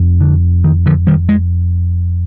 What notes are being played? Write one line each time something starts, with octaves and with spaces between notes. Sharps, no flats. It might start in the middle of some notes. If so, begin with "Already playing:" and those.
Already playing: F1 F2
D3
D#3
D3 F3
D#3 G3
G#3